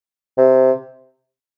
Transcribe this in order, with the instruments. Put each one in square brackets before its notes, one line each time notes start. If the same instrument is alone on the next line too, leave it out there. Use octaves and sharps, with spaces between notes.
[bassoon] C3